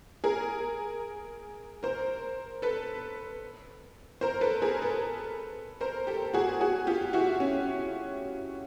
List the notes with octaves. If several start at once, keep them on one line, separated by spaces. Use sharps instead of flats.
G#4 A#4
A#4 C5
A4 B4
A#4 C5
A4 B4
G#4 A#4
A4 B4
A#4 C5
G4 A4
F#4 G#4
F#4 G#4
F4 G4
E4 F#4
C#4